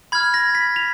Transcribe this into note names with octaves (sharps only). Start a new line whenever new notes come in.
B5 F6 G#6
A#6
B6
F7